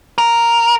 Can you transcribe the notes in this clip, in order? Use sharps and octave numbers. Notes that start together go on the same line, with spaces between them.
A#4